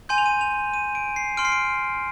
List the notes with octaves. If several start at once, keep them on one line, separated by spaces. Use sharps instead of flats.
G#5 C6 G6 D#7
F7
D#7
F7
D#7
D7
C7
C6 F6 D7
C7
D7